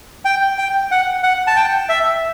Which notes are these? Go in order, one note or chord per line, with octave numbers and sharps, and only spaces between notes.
G5
G5
F#5
F#5
A5
G5
E5